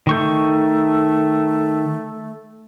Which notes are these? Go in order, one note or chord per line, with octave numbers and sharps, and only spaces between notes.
D#3 A3 C#6 G6